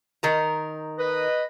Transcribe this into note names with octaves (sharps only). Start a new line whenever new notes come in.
D#3 A#4 A#5
B4 D#5